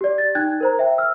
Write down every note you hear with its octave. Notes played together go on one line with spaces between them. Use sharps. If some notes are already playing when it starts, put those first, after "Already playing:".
G4 D5
A6
D#4 G5 F#6 G#6
A#4 C5 A#5
C5 E5 G5
E6 F6